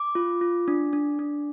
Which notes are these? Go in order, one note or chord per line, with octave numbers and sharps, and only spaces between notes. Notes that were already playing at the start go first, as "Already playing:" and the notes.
Already playing: D6
F4
F4
D4
D4
D4